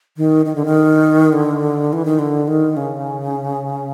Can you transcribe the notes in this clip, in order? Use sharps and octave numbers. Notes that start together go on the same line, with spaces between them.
D#3
D#3
D3
D#3
D3
E3
D#3
D3
D#3
C#3